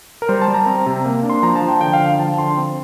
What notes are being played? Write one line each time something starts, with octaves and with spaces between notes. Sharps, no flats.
A#4
G3 C5
A5
G3
A#5
C4
C3
A#3
D4
C6
F3 A#5
A5
F3
G5
D3 G5
F5
D3
G5
F3 A5
D3 C6
C4